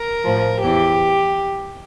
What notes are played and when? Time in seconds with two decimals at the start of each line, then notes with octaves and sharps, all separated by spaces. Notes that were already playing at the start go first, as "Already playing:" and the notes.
Already playing: A#4
0.25 A2 F3
0.62 E2 E3 G4